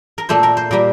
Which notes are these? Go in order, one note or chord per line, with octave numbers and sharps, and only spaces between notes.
A#4
A#2 A3 C5
A#4
C5
A#2 G3 A#3 A#4